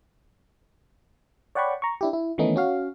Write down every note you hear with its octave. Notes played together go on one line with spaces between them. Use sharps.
C#5 D5 F#5 G5 B5 C#6
A#5 C#6
D4 E4 G4
E4
D#3 E3 A3 B3 C#4 D#4
C#4 F#4 F5